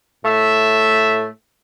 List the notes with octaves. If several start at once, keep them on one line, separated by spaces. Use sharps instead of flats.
A2 A3 E5